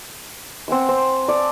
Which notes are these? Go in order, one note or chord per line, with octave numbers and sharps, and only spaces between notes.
C4 F#5 G#5 E6
C4
D5 A5